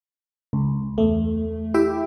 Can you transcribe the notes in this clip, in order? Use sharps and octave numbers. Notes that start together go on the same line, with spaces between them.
C#2
E2 A3
E4 G4 E5 G5